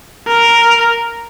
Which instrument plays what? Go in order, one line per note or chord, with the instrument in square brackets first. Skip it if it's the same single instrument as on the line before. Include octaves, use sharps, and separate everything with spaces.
[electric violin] A#4